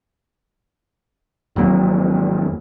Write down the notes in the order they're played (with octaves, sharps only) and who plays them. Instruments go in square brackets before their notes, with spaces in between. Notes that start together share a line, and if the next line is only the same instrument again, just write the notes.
[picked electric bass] G#1 F2 F#3 A#3